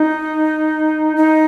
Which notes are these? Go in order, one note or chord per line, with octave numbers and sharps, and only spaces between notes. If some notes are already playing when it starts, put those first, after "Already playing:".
Already playing: D#4
D#4